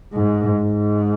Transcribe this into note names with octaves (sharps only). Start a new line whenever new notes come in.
G#2
G#2